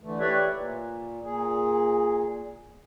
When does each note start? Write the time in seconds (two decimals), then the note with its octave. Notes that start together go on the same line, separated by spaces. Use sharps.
0.01 D3 E3 A3
0.20 G4 B4 C#5 D5 E5
0.53 A#2
1.23 A#2 G#4